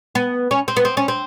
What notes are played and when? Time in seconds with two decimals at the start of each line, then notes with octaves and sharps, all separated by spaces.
0.15 B3
0.51 C#4
0.68 C4
0.77 B3
0.85 C4
0.97 C#4
1.08 C4